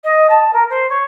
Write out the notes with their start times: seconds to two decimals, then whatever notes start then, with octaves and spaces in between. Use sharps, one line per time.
0.04 D#5
0.29 A5
0.53 A#4
0.70 C5
0.89 C#5